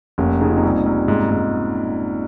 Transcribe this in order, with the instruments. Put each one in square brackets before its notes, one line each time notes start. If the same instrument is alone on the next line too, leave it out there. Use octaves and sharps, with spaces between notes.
[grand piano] F1 [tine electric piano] A#3 C#4
[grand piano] C#3 [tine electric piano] D#4
[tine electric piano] F4
C4 D#4
[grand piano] C2
C2
G#2
G#2